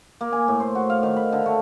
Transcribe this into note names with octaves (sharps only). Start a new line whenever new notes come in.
A#3
G#5
A2
C5
F#4
F5
D#3
B5
D3
A3